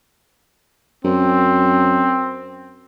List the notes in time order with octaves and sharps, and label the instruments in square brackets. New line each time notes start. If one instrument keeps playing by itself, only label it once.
[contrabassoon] F#2 [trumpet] C4